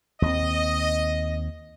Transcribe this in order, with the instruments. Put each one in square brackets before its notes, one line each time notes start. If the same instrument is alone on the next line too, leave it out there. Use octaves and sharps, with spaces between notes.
[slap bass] D#2 C4 [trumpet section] D#5